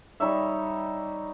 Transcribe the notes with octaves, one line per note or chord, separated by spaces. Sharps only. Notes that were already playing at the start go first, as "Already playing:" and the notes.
G3 D#4 C#5 E5